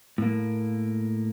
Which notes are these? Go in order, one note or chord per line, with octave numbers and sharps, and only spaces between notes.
A2 A#3